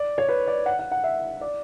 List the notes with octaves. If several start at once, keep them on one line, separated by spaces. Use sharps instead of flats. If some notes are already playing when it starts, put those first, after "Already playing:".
Already playing: D5
C#5
B4
D5
F#5
F#5
F#5
E5
D5